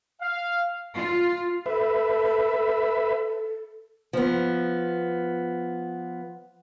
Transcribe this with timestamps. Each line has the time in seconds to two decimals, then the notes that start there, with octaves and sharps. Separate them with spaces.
0.20 F5
0.95 F4
1.66 A4 B4 E5
4.13 F3 B3